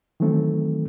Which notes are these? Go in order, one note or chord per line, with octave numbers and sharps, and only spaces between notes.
D#3 E3 F#3 A3 C4